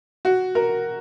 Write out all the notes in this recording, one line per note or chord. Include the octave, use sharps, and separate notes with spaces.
F#4
A#4